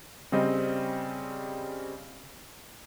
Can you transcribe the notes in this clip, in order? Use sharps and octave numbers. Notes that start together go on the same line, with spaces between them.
C#3 G3 C4 D#5 G5